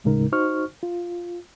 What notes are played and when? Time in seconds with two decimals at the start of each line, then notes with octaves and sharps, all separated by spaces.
0.04 D#2 A2 C#3 G#3 D#4 A#4
0.32 D#4 F#4 C5 C#6 F6
0.83 F4